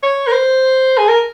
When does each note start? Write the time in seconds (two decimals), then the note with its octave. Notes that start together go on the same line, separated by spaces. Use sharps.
0.03 C#5
0.27 A#4
0.32 C5
0.98 G#4
1.09 A#4